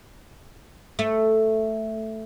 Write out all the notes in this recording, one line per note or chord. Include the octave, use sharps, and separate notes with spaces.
A3